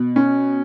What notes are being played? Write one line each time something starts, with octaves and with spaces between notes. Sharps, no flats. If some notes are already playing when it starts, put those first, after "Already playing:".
Already playing: B2
C#4